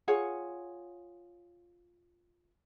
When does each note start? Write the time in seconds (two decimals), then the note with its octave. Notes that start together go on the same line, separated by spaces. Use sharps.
0.08 F4 G#4 C#5 F#5